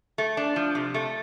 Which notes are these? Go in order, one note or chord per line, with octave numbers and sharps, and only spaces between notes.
A3
D4
F3
C3
A3